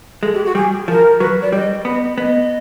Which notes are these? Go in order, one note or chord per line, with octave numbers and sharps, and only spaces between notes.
G#3 A4
G4
F#4
G3 G#4
F3 A#4
F#3 B4
D5
G3 D#5
B3 D#5
B3 D#5